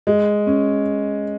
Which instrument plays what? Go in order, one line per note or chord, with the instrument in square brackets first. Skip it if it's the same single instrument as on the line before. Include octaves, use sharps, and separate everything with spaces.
[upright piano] G#3
C#4